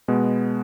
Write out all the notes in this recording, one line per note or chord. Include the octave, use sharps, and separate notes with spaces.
B2 G#3 B3